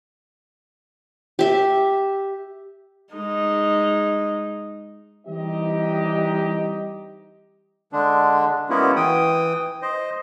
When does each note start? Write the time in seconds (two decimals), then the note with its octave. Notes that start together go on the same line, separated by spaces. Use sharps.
1.39 G4 E5
3.14 G#3 D#4
5.27 E3 G3 C4 D#4 G4 D#5
7.92 D3 G#3 D4
8.70 G#3 A#3 B3 C#4 E4 F#4
8.96 E3 G5 D#6
9.82 C5 D#5